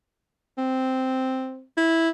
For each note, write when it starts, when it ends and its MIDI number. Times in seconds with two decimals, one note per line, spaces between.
0.58 1.63 60
1.77 2.09 64